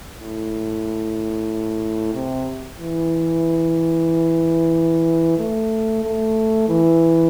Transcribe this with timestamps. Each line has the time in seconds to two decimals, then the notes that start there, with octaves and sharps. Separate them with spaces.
0.19 A2
2.14 C3
2.79 E3
5.38 A3
6.04 A3
6.69 E3